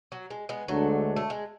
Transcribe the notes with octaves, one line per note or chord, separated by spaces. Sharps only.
F#3
G#3
G#3 B3
D2 D3 F#3 G#3 A3 D4
A3
G#3